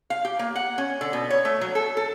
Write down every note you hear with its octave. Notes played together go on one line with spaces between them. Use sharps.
F5
G4
A#3
F#5
C#4
D3
B2
C#5
A3
F#3
A4
A4